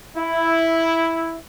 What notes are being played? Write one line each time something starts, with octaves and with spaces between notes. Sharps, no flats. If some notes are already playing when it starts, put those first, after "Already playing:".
E4